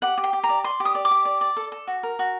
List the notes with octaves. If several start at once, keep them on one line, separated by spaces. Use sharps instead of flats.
G4 F#5
G4
G5
G4
A#5
D5
D5 C6
G4
D#6
D5
D6
G4
D5
D5
A4
A4
F#4
A#4
F#4